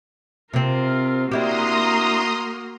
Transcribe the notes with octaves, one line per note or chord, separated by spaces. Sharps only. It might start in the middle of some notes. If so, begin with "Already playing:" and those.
C3 C4 F4 A#4
A#3 D4 E4 F#4 G4 A#5 C6 D#6